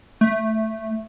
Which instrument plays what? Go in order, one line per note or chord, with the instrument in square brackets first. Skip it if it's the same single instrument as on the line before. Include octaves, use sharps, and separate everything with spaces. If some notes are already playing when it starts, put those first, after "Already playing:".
[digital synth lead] A3